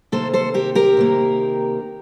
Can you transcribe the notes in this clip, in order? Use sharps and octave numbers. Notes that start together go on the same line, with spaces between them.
C3 D#3 A#3 A4 C5
A4 C5
G4 A#4
G4 A#4
C3 D#3 A#3